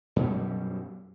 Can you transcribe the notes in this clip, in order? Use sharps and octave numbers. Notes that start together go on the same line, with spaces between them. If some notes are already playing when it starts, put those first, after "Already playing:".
F#2 B2 G3